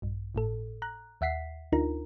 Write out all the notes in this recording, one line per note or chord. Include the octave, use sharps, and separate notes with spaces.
A#1 G2
G#1 A2 A4
A#5 F#6
D#2 E5 F#5 B6 C7
D2 D4 D#4 F4 A#4 A#5